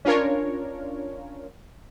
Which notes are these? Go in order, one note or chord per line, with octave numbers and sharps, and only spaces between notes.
C#4 D4 F4 A#4 C#5